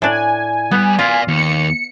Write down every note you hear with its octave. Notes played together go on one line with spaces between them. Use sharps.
A2 D4 G#5
G3 B3
F4 D5 F5
D#2 C#7